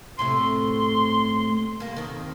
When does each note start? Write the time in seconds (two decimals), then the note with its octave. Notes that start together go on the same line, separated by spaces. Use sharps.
0.19 A2 C3 A3 C6
1.80 G2 A#3
1.96 F2 D#3